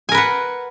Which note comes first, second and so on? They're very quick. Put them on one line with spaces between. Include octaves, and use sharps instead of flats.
G#5 A#4 B4 F#5